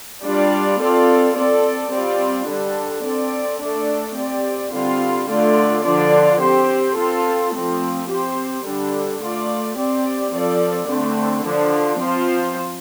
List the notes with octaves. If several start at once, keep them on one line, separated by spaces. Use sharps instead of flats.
G3 D4 F4 D5
C4 F4 A4 D5
C4 A4 D5
G3 C4 F4 D5
D3 G3 D4 A4
C4 A4 D5
A3 D4 A4 D5
C4 G4 D5
D3 G3 C4 F4
D3 A3 F4 D5
D3 F3 D4 F4 D5
C4 G4 C5
C4 F4 A4
F3 A3 C4
C4 G4 C5
D3 G3 D4 A4
A3 F4 D5
C4 G4 D5
F3 C4 A4 D5
D3 A3 C4
D3 F3 D4
F3 C4 F4 C5